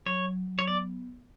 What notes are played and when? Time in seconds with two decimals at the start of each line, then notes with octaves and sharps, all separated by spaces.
0.06 F#3 C#5
0.27 F#3
0.47 F#3
0.59 C#5
0.67 B3 D5